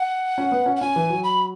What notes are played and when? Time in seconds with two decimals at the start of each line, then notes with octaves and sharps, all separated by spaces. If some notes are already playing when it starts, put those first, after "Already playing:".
Already playing: F#5
0.38 C#4
0.52 B3
0.66 C#4
0.76 F#5
0.81 C#4 G#5
0.96 E3
1.10 F#3
1.24 B5